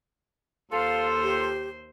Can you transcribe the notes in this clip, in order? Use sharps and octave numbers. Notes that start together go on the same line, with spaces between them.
D#2 F4 A4 C5 F5
G4